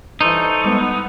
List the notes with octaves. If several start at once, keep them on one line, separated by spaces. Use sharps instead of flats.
G2 E3 D#4 A4 C5 C#6
G3 G#3 B3